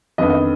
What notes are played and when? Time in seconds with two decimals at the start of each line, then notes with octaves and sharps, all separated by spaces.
0.18 F2 D#3 B3 D4 D#5
0.30 D#5